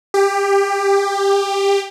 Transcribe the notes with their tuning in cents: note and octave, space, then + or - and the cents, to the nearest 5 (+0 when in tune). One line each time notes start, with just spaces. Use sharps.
G4 +20